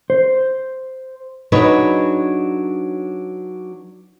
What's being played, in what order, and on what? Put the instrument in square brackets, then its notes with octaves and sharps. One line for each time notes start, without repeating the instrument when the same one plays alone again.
[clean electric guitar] C5
[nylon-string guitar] F#3 D4 D#4 G#4 B4 C#5